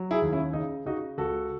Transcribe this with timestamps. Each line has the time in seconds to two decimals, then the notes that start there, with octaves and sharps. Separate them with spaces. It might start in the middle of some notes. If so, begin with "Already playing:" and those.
Already playing: F#3
0.11 E4 G#4
0.22 D#2
0.32 C#4 E4
0.53 C#3 D#4
0.85 C#3 D#4 F#4
1.18 C#2 F#4 A4